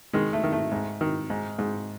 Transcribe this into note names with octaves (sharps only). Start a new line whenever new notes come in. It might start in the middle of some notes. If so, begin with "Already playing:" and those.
D#3 G#3
A3
D#3
A3
G#2
D#3
G#2
G#2